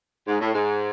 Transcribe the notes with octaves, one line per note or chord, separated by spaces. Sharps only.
G#2
A2
G#2